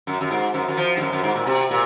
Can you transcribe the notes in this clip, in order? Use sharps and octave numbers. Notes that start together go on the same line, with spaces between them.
F#2
F#2
G#2
F#2
F#2
F3
G#2
F#2
F#2
G#2
A#2
C3
A#2